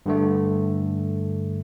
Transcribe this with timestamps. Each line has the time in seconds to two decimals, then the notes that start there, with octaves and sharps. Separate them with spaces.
0.06 G2 D3 A3